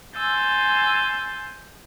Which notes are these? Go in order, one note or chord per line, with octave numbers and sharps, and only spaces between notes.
G#5 C6 E6 G6 A6